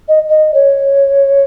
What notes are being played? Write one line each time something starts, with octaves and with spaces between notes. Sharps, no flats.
D#5
D#5
C#5